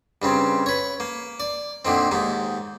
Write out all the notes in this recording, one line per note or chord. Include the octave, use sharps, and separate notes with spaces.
G2 C#3 C4
B4 C#5
A#3
D5
A#2 D3 D#3 C4
D#2 G#2 D#4